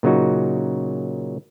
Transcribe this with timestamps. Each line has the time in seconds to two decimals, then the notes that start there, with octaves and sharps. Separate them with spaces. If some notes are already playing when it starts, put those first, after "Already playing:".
0.03 A#2 C#3 F#3 D#4 F#4